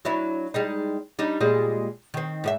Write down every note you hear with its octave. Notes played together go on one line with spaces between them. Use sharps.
F#3 D4 E4
G3 G#3 D#4
G3 D4 D#4
A#2 G3 G#3
D#3 C4
G#2 G4 E5